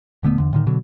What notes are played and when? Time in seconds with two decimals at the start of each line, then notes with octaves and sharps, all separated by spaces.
0.23 D#1 D3 A3 B3
0.38 E2 D3
0.53 A2 D3 D#3
0.67 B2 D3 F#3